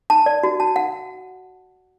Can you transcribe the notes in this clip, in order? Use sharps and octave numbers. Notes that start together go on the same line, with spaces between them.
A5
D5
F#4
A5
F#5